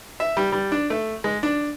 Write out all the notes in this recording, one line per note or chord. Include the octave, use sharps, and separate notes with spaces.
E5
G3
G3
D4
A3
G#3
D4